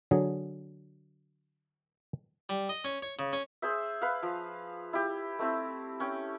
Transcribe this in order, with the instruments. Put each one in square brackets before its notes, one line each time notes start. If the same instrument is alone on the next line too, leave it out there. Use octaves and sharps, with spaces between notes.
[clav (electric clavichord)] D3 F#3 G#4
[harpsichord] G3
D#5
C#4
C#5
C#3
C#4
[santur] G#4 C5 E5
B4 F5
F3
E4 G4
A3 C4 E4
C#4 G5